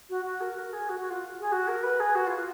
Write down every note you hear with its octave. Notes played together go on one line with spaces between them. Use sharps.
F#4
F#4
A#4
A#4
G#4
F#4
F#4
F4
G#4
F#4
A#4
B4
G#4
F#4
F4
F4